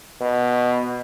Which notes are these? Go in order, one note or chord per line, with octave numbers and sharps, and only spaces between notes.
B2